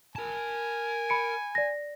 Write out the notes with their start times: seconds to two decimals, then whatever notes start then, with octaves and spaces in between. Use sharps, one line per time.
0.16 A#4 G#5 A5
1.09 B5 C#7 D7
1.55 D5 A#6